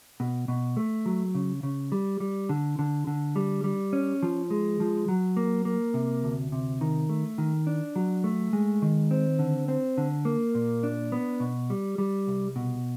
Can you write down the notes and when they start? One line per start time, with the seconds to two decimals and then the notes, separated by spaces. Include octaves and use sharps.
0.20 B2
0.48 B2
0.77 A3
1.06 F#3
1.35 C#3
1.63 C#3
1.92 G3
2.20 G3
2.49 D3
2.79 D3
3.07 D3
3.36 G3
3.64 G3
3.93 C#4
4.23 F3
4.50 G#3
4.80 F3
5.08 F#3
5.37 A#3
5.65 A#3
5.94 C3
6.24 D2
6.52 C3
6.81 D#3
7.09 A3
7.38 D#3
7.67 D4
7.96 F#3
8.24 A3
8.53 G#3
8.82 D#3
9.11 C4
9.39 D3
9.68 C4
9.98 D3
10.25 A#3
10.55 A#2
10.83 D4
11.12 B3
11.40 B2
11.70 G3
11.98 G3
12.27 C2
12.56 B2